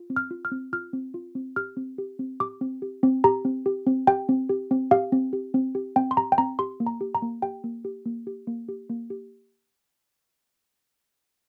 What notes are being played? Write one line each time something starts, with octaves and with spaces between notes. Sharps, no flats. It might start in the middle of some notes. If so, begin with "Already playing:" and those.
Already playing: F4
C4
F6
F4
F6
C4
F4 F6
C4
F4
C4
G4 F6
C4
G4
C4
G4 D6
C4
G4
C4
G4 A#5
C4
G4
C4
G4 G5
C4
G4
C4
G4 F5
C4
G4
C4
G4
C4 G5
C6
G4 A#5
G5
C4 A#5
G4 C6
A#3
A#5
G4
A#5
A#3
G4 G5
A#3
G4
A#3
G4
A#3
G4
A#3
G4